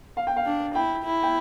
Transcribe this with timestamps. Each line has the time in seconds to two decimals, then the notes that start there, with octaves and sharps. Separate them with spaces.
0.17 F5
0.27 G5
0.36 F5
0.46 D4
0.75 E4 G5
1.04 E4
1.23 G5